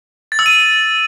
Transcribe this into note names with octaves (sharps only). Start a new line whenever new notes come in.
A6
E6
D#7